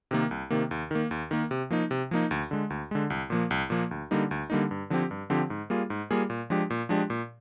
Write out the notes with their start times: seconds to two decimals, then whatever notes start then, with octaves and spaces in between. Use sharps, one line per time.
0.11 C3 D#3 A#3
0.31 C2
0.50 C3 D#3 A#3
0.71 D#2
0.91 D#3 A#3
1.11 D#2
1.31 D#3 A#3
1.51 C3
1.70 F3 A#3 D#4
1.91 C3
2.11 F3 A#3 D#4
2.31 D2
2.51 D3 G#3
2.70 D2
2.91 D3 G#3
3.10 C2
3.30 A#2 F3 A#3
3.51 C2
3.70 A#2 F3 A#3
3.91 D2
4.11 D3 G3 A#3 D#4
4.31 D2
4.50 D3 G3 A#3 D#4
4.71 G2
4.90 D3 F3 C4 G4
5.11 G2
5.30 D3 F3 C4 G4
5.50 G#2
5.70 G3 A#3 F4 G#4
5.90 G#2
6.11 G3 A#3 F4 G#4
6.30 A#2
6.50 F3 G#3 D4 G4
6.70 A#2
6.89 F3 G#3 D4 G4
7.10 A#2